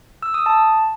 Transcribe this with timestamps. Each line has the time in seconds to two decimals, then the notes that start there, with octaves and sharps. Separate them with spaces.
0.22 E6
0.34 D#6
0.46 A5